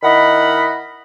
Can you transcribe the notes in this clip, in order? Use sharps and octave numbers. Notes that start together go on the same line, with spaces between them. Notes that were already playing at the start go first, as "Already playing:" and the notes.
D#3 E4 D#5 F#5 B5